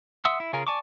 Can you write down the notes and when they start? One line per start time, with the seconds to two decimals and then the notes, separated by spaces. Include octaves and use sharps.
0.25 E5 F#5 C6 D#6 E6
0.40 E4
0.53 C#3 C#4 F4 G#4 A#4
0.67 D5 G#5 A5 C#6 D6